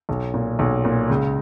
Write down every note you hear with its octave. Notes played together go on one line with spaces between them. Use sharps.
B1
A#2
B1
A#2
C#2